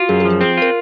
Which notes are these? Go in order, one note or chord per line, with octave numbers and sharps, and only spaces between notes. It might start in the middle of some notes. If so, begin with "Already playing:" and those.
Already playing: F4 F#4
F#2 G#4
G#4
F3
G#4
C4 G#4
F4 A#4